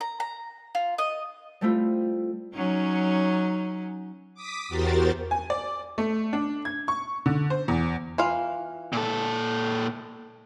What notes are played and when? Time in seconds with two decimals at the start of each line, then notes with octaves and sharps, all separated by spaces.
0.01 A#5
0.20 A#5
0.75 F4
0.98 D#5
1.61 G3 A3 C4 E4 F4
2.55 F#3 C#4 D#4
4.34 D6 D#6 B6
4.68 E2 F#4 G4 A#4 C5 A6
5.31 G#5
5.50 D5
5.98 A3
6.33 D4
6.65 G#6
6.88 C#6
7.26 D3
7.50 C5
7.68 E2
8.18 E3 F4 F5
8.93 A#2 A4